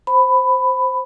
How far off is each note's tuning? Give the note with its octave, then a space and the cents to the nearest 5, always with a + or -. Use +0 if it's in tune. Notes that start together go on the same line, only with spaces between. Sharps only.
C5 +0 B5 +15